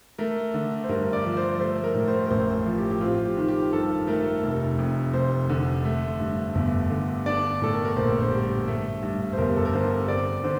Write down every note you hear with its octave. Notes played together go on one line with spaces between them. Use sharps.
A3 A#4
D3
C5
G2 A#4
D5
F3
C5
A3 C5
A#4
A2
C5
A#4
A1 C5
F3
G4
G4
C4 F4
G4
D#3
G4
G2 A4
A3 A#4
F1
F2
F1 C5
D3
A3
G2
G1
D3
D4 D5
A2 A4
A#4
A#4
A#1 C5
C5
G3
A3
G2
C5
G1 A#4
G4
A4
A#4
D3 C5
C4 D5
D3 C5